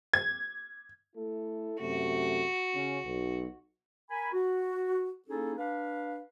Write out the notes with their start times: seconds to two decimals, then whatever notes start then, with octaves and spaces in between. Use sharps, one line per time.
0.13 G#6
1.16 A3 E4 A4
1.80 F#2 C3 A3 F#4
2.75 C#3 C#4
3.06 B1
4.10 A#4 G#5 B5
4.33 F#4
5.29 A#3 C#4 D#4 E4 G#4 A4
5.58 D4 B4 F5